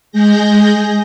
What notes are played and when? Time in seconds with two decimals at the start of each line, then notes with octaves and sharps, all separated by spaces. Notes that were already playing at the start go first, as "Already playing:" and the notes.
0.12 G#3 G#4 G6 A#6